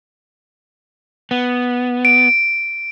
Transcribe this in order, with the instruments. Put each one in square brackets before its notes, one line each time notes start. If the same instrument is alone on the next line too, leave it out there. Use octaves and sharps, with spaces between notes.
[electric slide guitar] B3
[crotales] D7